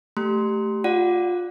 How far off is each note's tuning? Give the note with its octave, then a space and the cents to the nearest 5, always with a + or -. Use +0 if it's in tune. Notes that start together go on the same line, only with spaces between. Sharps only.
A3 +0 G4 +0 C6 -5
F4 +20 D5 +0 F#5 +0